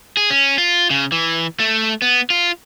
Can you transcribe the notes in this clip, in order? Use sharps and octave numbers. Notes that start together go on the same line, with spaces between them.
G#4
C#4
F4
C#3
E3
A3
B3
F4